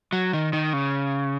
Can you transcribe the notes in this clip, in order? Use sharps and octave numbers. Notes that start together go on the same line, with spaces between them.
F#3
D#3
D#3
C#3